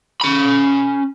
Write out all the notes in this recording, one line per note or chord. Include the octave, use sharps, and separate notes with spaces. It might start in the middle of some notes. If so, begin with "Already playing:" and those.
C#4 B5